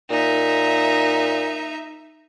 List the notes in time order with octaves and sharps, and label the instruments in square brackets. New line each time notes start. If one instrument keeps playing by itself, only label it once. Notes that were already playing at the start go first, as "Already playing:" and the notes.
[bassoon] A#2 [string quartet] D#4 E5